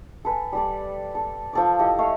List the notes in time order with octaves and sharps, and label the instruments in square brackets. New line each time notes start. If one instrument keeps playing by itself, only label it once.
[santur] A4 B4 G#5
G3 A4 D5
A4
F3 A4 D5
E4 G4 A4 D#5
A3 C#5 F5